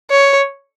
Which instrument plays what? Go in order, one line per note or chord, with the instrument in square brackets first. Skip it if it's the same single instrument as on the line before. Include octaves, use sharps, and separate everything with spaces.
[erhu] C#5